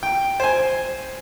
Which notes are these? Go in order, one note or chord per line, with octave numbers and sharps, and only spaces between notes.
G5
C5 G#5